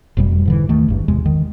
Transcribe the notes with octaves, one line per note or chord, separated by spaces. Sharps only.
F1 F2 B2 G3
G#2 D3 E3
D#2 D#3 A3
G#1 G2
E2 C3 G#3
D#3